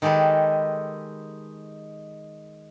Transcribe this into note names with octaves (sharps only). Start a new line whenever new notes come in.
D#3 G#3 G4 A4 B4